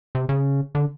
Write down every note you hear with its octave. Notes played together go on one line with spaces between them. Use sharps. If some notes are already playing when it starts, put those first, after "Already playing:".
C3
C#3
D3